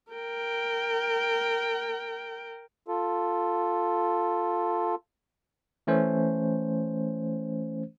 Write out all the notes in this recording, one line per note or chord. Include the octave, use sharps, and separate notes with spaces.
A#4 G5
F4 A4
E3 A3 C#4 C5